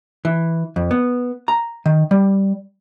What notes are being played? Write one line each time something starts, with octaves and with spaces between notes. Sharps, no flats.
E3
F2
B3
A#5
D#3
G3